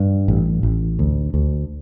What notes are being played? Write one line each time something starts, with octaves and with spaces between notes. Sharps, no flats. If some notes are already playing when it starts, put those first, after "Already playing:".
Already playing: G2
A1
A1
D2
D2